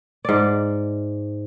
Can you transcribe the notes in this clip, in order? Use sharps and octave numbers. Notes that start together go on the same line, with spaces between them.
G#2 D5